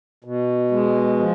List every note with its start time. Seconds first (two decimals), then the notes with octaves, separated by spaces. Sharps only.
0.24 B2
0.71 G#3
1.18 F3